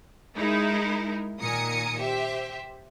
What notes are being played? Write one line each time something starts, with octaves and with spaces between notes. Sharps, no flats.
G#3 D#4 E4 A#4
A#2 D#3 A#4 G#5 D#6 C#7
G4 C5 E5